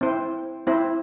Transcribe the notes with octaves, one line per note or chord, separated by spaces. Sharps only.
C4 E4 C5
C4 E4 C5